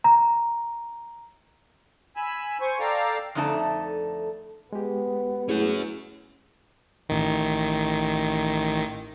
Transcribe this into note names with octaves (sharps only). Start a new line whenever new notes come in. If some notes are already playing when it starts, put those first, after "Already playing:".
A#5
G#5 B5 E6
C5 G#5 C#6
A4 D5 F5 G5 A#5
F2 D3 A3 D#4 D5 A5
G#3 B3 G4
A3 C#4 E4 F#4 G#4
A1 D#3